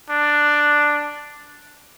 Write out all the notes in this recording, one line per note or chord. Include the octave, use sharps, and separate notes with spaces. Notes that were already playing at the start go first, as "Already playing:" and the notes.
D4